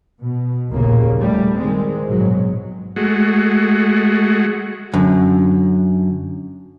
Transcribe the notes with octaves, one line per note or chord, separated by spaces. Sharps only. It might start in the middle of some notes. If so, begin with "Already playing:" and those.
B2
F1 A#1 D#2 A#2 C#3 A#3
G3 A3
D#3 G#3 C4
A#1 G#2 B2 F#3
G#3 A3 F#4
F#2 D3